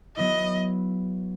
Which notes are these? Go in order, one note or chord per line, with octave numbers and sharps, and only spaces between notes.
F#3 B3 E4 D#5